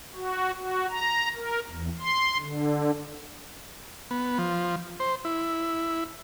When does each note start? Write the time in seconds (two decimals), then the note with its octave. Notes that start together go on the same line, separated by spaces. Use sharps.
0.15 F#4
0.55 F#4
0.90 A#5
1.35 A#4
1.68 E2
1.99 C6
2.37 D3
4.11 B3
4.38 F3
5.00 C5
5.25 E4